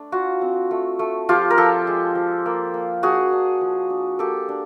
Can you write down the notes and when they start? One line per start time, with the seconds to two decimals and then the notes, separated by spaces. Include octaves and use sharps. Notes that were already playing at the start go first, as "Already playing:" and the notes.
Already playing: A3 D4
0.12 F4 F#4
0.42 C4
0.71 A3
0.99 A3
1.29 F3 F4 G4
1.50 A#4
1.58 F3 G4 A4
1.87 G#3
2.15 F3
2.46 A#3
2.74 A#3
3.03 D4 F#4 G#4
3.32 D4
3.61 F3
3.90 D4
4.19 A#3 G4 A4
4.49 D4